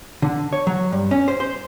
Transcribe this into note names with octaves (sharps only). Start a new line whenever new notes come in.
D3
C#5
F#3
G2
C#4
C5
C5